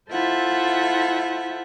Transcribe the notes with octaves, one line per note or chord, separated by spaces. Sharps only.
E4 F4 A4 C5 E5 F#5